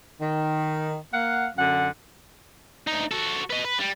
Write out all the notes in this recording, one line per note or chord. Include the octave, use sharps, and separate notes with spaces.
D#3
A#3 F5 F#5
F#2 D3 F#5
D2 D#4
F#4 A4
B4 D#5
B4
G3